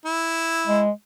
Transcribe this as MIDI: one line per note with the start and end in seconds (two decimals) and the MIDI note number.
0.05 0.82 64
0.67 0.91 56